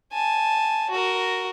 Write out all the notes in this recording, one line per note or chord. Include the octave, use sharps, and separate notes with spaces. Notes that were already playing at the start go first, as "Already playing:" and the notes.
G#5 A5
F#4 A#4